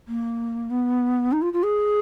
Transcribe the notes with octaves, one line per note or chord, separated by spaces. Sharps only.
A#3
B3
D#4
F4
F4
G#4